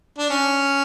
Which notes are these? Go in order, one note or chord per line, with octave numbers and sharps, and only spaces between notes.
D4
C#4